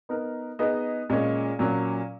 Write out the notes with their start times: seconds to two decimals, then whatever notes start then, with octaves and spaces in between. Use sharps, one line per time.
0.09 B3 D#4 A#4
0.59 B3 D#4 G#4 D#5
1.09 A#2 G#3 C#4
1.59 A#2 F#3 C#4